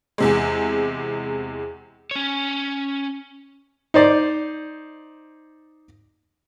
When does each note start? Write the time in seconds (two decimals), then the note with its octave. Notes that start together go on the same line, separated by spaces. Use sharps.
0.18 E2 C3 G#3
2.11 C#4 C#5
3.94 D#4 C5 D5